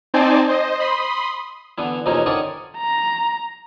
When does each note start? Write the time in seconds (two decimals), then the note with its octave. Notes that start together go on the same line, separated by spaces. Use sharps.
0.14 C4 D#4 C5 D5 G#5 A5
0.49 C5 D#5
0.80 B5 C6 D#6
1.78 D3 E3 B3
2.06 F2 C3 E3 A#3 C#4 D#4
2.26 D3 D#3 C#4 D5 C#6 D#6
2.78 A#5